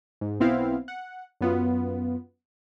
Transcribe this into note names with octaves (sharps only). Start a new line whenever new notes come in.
G#2
B1 B3 C4 E4 F5
F#5
F#2 B3 F4